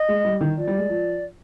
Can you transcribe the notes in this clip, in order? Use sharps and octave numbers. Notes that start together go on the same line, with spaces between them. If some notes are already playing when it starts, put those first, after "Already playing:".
Already playing: D#5
G#3
G3
D#3
F3 D5
G3
G#3
F3